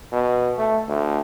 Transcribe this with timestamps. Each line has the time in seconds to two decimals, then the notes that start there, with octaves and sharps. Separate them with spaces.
0.12 B2
0.58 A3
0.88 D2